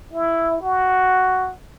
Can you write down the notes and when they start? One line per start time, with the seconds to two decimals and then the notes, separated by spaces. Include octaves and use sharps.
0.13 E4
0.61 F#4